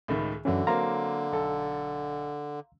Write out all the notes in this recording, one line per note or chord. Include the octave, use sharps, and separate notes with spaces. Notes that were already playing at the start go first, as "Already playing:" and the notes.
C#2 A2 D#3
F#2 D3 E3 F#3 C#4
F#3 A#3 C4 F5 A#5 C6
B1 A4